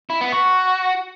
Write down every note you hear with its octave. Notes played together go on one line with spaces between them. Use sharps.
E4
B3
F#4